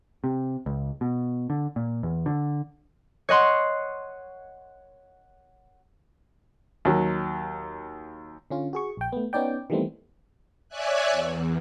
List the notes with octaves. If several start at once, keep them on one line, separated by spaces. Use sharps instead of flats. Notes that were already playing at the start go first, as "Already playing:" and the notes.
C3
C#2
B2
D3
A#2
E2
D3
C#5 D#5 F#5 C6
D#2 F#3
D3 C#4 F4
F#4 G#4 C#6
A#1 G5
A3 B3
B3 C#4 D#4 D5 G5
D#3 E3 G3 A3 B3 C4
C#5 D5 E5 G#5 F#6
E2